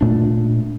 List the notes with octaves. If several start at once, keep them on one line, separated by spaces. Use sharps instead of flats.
A#2 A3 D4